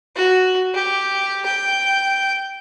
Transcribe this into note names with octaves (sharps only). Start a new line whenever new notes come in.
F#4
G4
G5